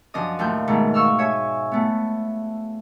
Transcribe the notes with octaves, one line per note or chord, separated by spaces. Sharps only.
F#2 F3 D4 D#5 D#6
D#2 A2 F4 G6
G#2 B2 D#3 A3
F5 C#6 E6 F6
C#5 E5 G#5
A3 B3